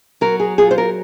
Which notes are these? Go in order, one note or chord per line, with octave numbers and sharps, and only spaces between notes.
F#3 A#4
G#4
F4 G#4
C5
A#4